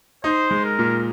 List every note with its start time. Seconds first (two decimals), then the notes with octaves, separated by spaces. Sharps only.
0.24 D#4 C5
0.51 G#3
0.65 A#4
0.79 A#2